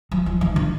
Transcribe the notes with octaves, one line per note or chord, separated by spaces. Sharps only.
F#3
F3
D#3
D3